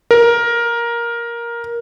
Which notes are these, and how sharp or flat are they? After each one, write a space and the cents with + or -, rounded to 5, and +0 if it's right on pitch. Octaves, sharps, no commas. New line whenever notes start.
A#4 +10